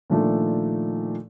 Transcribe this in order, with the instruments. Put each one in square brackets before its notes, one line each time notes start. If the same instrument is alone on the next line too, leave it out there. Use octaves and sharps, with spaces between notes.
[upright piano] A#2 D#3 F3 A3 D4 A4